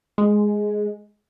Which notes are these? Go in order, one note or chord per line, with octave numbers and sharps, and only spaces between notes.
G#3